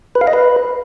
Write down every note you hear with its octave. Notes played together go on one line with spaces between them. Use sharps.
B4
F5
D#5
B4